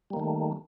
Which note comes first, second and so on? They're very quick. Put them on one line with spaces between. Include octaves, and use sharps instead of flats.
G3 A#3 D#3 A3